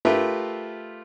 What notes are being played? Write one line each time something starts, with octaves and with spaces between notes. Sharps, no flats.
A3 F4 G4 A#4 B4 E5